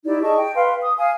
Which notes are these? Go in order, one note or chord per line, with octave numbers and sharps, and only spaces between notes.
D#4 E4 G4 D5
G#4 D#5 A5 C#6
G5
B4 F5 C6
D#6
F5 G#5